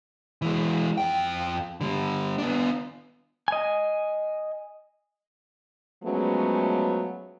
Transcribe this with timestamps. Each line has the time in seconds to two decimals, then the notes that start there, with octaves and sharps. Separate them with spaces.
0.42 E3 G#3
0.98 F2 G5
1.81 D3 G3
2.38 B3 D4
3.48 D#5 G#5
6.04 F3 F#3 G#3 A3 B3 C#4